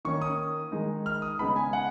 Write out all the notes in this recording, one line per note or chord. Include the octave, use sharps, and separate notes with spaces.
D#3 A#3 C#4 C#6
D#6
D#3 G#3 D#4
F6
D#6
C#3 G#3 B3 D#4 B5
G#5
F#5